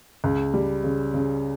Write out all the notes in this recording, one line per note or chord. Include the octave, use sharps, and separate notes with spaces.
C#2
G3
C#3
C#3